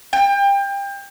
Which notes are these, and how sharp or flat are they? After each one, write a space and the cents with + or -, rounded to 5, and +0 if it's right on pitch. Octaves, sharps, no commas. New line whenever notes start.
G5 +30